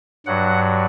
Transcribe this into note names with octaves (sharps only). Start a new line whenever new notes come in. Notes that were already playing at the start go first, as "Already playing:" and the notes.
G2 F#3 F#5